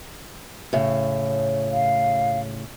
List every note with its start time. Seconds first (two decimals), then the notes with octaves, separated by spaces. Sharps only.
0.73 A2 C#3
1.72 F5